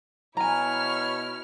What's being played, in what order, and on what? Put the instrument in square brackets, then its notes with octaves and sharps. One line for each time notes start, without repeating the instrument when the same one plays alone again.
[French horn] B2 [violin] E4 F6 [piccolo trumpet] C#5 [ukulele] G#5 A#5